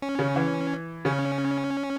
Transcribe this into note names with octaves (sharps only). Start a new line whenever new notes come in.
C#4
C#3
E3
C#3 C#4